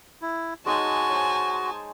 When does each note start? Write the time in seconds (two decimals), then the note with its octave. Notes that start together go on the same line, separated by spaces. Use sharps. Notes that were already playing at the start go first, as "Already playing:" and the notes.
0.22 E4
0.66 G#3 D#4 F#4 C#5 G#5 A5
1.10 C5 C#5